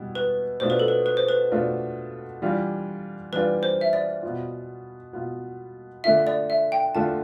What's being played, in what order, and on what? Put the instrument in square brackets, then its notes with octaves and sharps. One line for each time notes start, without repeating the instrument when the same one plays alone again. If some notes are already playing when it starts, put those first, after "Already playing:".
Already playing: [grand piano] B2 G3 B3 E4
[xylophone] B4
[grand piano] B2 A3 D4 F4 [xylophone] C5
[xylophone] B4
A4
B4
B4
C5
B4
[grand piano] B2 A3 D4 F4
E3 G3 D4 F4
[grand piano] E3 G3 D4 F4 [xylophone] B4
[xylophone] C5
E5
D5
[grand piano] B2 B3 F4
B2 B3 F4
[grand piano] D3 A3 D4 F4 [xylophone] E5
[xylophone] D5
E5
G5
[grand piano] D3 A3 D4 F4 [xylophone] A5